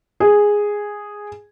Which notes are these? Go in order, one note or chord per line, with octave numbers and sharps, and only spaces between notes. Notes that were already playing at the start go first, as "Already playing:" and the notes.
G#4